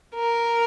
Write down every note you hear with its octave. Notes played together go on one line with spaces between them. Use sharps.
A#4